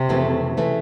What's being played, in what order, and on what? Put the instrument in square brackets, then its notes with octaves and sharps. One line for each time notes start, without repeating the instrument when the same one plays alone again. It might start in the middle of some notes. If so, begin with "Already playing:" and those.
Already playing: [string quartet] C3
[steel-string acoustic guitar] F2 C#3 E3 A3
C#3 E3 A3